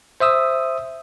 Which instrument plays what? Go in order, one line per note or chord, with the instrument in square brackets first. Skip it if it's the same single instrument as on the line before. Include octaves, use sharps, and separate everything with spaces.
[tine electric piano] C5 E5 D#6 E6